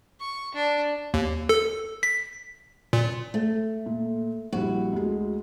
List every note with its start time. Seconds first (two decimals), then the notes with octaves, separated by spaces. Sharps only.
0.21 C#6
0.55 D4
1.14 D#2
1.49 A4
2.03 B6
2.93 A#2
3.34 A3
3.86 A#2
4.53 A#1 G3 E4 F#4
4.93 D2 G#3